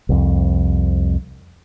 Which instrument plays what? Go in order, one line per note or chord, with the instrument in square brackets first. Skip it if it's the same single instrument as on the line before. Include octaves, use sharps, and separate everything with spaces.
[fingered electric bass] C2 F2